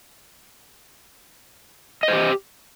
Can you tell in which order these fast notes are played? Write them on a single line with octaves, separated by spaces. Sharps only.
D#5 C5 G4